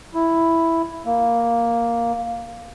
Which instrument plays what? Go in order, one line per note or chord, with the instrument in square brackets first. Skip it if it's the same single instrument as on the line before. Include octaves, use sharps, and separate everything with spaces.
[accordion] E4
A#3